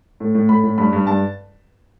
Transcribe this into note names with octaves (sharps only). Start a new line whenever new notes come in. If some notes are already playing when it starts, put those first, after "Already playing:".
A2
A2
A2 B5
A2
G2 B5
G2
G2 A5